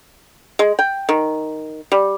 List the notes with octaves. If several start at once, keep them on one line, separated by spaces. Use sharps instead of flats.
G#3
G5
D#3
G3